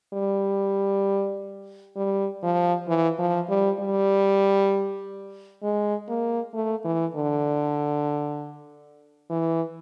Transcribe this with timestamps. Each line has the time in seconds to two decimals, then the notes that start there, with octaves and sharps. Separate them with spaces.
0.13 G3
1.96 G3
2.43 F3
2.88 E3
3.19 F3
3.49 G3
3.80 G3
5.63 G#3
6.09 A#3
6.54 A3
6.85 E3
7.15 D3
9.30 E3